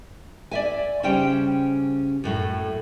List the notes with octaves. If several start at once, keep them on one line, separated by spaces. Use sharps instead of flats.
D5 E5 G#5
C#3 G3 C#4 C5 G5
F#2 A2 A3